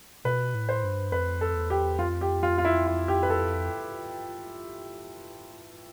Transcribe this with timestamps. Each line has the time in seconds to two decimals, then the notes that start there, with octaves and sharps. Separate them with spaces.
0.25 B2 B4
0.55 A2
0.69 C5
0.84 G2
1.12 F2 B4
1.41 A4
1.55 E2
1.70 G4
1.99 F2 F4
2.21 G4
2.43 F4
2.58 F4
2.65 E4
2.86 F4
3.08 G4
3.23 B4
3.30 A4